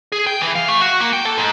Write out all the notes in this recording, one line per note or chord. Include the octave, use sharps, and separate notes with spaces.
G#4
G5
E3
F5
A3
F#4
A#3
G5
A4
G#2